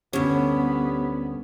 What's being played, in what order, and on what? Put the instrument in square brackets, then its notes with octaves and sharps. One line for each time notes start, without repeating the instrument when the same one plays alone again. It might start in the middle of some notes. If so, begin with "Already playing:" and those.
[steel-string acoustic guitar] D2 G2 [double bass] B3 [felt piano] C#4 [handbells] D4 G4 C#5